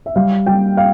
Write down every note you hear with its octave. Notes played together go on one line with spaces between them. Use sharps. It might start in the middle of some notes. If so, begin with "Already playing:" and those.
E5
G3 F5
G3 G5
F5